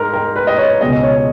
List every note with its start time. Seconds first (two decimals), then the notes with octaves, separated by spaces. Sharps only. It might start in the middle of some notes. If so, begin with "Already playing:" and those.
Already playing: G#2 G#3 A#4
0.13 A#4
0.36 B4
0.47 D#5
0.58 C#5
0.80 C#2 B2 G#3 D#5
1.03 C#5